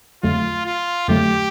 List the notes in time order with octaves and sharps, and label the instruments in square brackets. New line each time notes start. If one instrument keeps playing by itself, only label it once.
[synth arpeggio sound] F2 D3 F#3 A3 [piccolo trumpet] F4
[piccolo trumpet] F4
[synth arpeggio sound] F2 D3 F#3 A3 [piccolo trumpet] G4